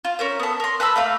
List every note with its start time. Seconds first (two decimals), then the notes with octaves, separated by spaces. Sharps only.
0.05 F4
0.19 C#4 A#4 C5
0.39 B3 A4
0.60 A#4 C6
0.80 B4 A5 B5 E6
0.96 A3 A#3 F5